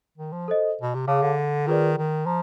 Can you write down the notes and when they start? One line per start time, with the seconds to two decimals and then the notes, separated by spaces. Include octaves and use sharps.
0.18 D#3
0.33 F3
0.48 A4 C5 D#5
0.81 B2
0.94 C3
1.07 C#3 G#4 C#5 F5 A5 D6
1.22 D3
1.67 D#3 F4 G#4 B4 D5
1.97 D#3
2.26 F3 A#5